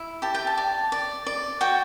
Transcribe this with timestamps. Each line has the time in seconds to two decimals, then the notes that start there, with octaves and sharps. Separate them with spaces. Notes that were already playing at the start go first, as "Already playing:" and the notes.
Already playing: E4
0.22 G4 A5
0.35 G5
0.47 A5
0.57 D5
0.92 D5
1.27 D5
1.61 F#4 G5